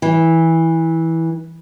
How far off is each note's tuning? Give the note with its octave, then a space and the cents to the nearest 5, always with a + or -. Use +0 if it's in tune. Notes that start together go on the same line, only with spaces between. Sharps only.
E3 -15